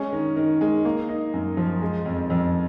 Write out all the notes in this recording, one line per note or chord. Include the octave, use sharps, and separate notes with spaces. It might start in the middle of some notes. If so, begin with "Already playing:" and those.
Already playing: G#3 C#4
D#3
D#3
G#3
A#3
D#4
F#2
F3
G#3
F2
F2